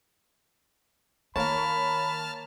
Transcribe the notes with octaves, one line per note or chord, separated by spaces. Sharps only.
D#3 A#3 A#4 C#5 A5 B5 F6